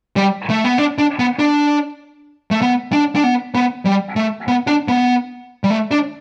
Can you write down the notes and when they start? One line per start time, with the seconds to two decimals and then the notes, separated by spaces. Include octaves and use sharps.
0.16 G3
0.50 A3
0.64 B3
0.78 D4
0.98 D4
1.19 B3
1.39 D4
2.51 A3
2.62 B3
2.92 D4
3.15 D4
3.24 B3
3.55 B3
3.85 G3
4.16 A3
4.48 B3
4.67 D4
4.88 B3
5.64 G3
5.70 A3
5.91 D4